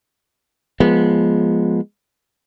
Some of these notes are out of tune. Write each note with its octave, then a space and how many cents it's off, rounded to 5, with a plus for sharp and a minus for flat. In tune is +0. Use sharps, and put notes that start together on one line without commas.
F3 +0 G#3 +0 B3 -20